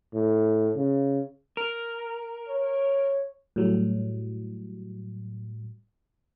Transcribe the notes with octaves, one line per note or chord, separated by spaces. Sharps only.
A2
C#3
A#4
C#5
A2 F#3 G3